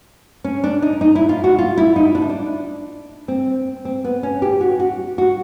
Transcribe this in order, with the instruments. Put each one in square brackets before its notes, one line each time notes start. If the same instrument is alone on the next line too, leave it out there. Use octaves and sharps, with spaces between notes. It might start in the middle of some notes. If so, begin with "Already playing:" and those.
[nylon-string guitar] C#4
D4
D#4
D#4
E4
F4
F#4
F4
E4
D#4
D4
D#4
D4
C4
C4
B3
C#4
G4
F#4
F#4
F#4